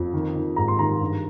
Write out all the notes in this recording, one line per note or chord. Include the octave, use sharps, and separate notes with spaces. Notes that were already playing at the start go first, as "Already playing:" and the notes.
Already playing: F2
D#3
D#3
G#2 A#5
C6
D#3 A#5
G2